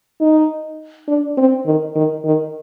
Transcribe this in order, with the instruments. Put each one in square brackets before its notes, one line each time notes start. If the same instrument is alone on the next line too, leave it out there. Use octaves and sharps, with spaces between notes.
[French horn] D#4
D4
C4
D#3
D#3
D#3